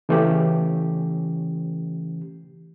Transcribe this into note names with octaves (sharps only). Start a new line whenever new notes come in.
C#3 E3 A3 C#4 G4